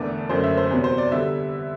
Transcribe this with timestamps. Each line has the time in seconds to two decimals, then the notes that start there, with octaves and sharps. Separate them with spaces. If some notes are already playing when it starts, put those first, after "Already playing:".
Already playing: E1 E2 D3 A3 D4 B4
0.29 F#1 F#2 D3 A3 C5
0.44 E5
0.57 C5
0.71 E2 C3 F#3 B3
0.84 C5
0.98 D5
1.12 D3 G3 B3 E5